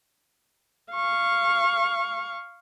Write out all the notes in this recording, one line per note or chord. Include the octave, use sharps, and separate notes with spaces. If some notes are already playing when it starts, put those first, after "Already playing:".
F5 C#6